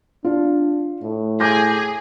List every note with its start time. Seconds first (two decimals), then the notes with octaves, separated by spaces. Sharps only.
0.24 D4 F4
1.02 A2
1.40 G#4 D6 G6 A#6